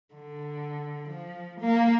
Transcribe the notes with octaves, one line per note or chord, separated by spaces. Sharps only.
D3
F3
A#3